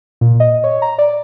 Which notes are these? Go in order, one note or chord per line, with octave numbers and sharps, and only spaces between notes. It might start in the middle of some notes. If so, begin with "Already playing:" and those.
A#2
D#5
C#5
A#5
D5